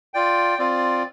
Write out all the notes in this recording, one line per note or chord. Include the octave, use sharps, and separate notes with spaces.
F4 D5 G5
C4 F4 D5